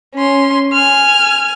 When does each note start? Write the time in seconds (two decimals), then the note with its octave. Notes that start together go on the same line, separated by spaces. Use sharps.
0.15 C#4 C6
0.73 G#5 F6